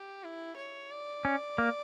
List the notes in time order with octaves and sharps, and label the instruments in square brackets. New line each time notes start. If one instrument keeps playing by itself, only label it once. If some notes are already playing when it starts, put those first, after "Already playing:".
Already playing: [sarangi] G4
E4
C#5
D5
[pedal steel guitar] C#4
A#3